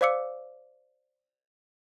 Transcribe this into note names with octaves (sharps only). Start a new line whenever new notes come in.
C5 D5 F5 D6 E6 C#7